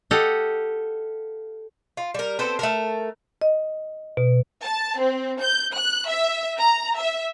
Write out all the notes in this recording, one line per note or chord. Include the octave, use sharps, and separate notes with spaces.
G4 A4 D#5 F5 F#5
F4
G3 A#4
B3 C4 A4 C5
A3 A4 A#4
D#5
B2
A5
C4
G6
F#6
E5
A#5
E5